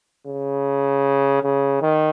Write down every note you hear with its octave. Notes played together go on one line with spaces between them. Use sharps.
C#3
C#3
D#3